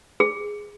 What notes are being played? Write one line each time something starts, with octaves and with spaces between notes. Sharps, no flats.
G#4